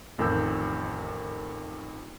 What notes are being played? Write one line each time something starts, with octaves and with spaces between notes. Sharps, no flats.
A1 F2 D#3 A#4 E6 G6